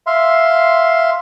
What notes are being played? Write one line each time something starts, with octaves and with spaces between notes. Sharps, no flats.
E5 F5 C6